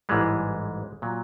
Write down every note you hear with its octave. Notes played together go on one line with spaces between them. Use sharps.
A1 G#2 E3 G3 G#3
A#2 F#3